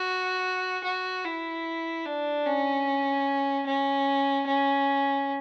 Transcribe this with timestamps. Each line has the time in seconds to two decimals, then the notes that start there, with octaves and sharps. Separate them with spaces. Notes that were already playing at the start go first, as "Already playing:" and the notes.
Already playing: F#4
0.84 F#4
1.24 E4
2.06 D4
2.46 C#4
3.67 C#4
4.47 C#4